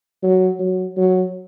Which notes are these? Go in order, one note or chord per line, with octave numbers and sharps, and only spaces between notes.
F#3
F#3
F#3